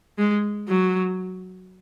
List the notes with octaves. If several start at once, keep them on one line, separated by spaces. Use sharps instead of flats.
G#3
F#3